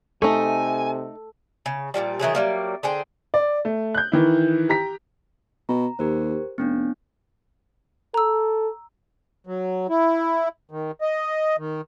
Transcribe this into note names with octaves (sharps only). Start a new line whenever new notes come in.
C3 A3 D#4 A4 G#5
C#3
A#2 E3 F3 G3
D#3 E3 F#3 G#4
F#3 G3 A#3
D3 G#4 C5 G5
D5
A3
F#6 G6
D#3 E3 E4
G4 A#5 B6
B2 A#5
D#2 G4 A#4 C5
F1 B3 C#4 D4
A4 A#5 E6
F#3
E4
D#3
D#5
D#3